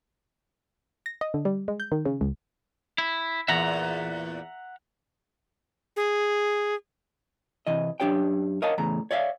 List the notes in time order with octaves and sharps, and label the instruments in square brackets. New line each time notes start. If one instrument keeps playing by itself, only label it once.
[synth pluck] A#6
D#5
D3
G3
G#3
G6
D#3
C#3
C#2
[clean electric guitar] E4
[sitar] E2 A#2 [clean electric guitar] E5 F#5 A#5
[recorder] G#4
[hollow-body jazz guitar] C3 E3 D#5
F#2 D4 G4 C#5 G5
A#4 C#5 D#5 F5 F#5 A5
E2 A2 C#3 A#5
C#5 D5 E5 F5